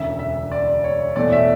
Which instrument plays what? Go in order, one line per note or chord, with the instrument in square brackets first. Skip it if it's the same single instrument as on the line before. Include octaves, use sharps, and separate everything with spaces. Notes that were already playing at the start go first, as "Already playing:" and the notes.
Already playing: [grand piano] E1 D2 C#3 E5
E5
D5
C#5
E2 B2 A3 D5
E5